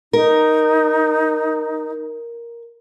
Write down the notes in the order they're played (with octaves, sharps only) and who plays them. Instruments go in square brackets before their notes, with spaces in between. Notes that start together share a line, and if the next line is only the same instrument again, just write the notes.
[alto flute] D#4 [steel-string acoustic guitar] A#4